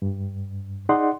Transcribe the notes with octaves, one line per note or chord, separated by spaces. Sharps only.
G2
D#4 G#4 D5 D#5 F#5 C6